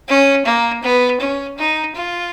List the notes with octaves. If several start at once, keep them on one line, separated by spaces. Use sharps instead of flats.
C#4
A#3
B3
C#4
D#4
F4